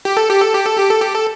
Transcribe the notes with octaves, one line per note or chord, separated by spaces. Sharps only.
G4
A4
G4
A4
G4
A4
G4
A4
G4
A4